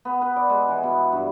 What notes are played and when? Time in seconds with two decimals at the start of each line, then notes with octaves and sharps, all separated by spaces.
0.05 B3
0.22 B4
0.36 D5
0.50 G#3
0.69 E3
0.83 B2
1.12 G2